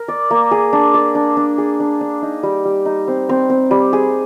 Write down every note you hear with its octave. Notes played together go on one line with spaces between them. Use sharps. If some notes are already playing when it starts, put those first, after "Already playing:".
Already playing: A#4
D5
A#3
G#4
D4
D5
D4
D4
G#4
D4
D4
D#4
G3
G3
D#4
C4
C4
C4
G3
G#4